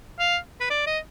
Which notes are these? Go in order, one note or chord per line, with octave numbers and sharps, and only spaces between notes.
F5
B4
D5
D#5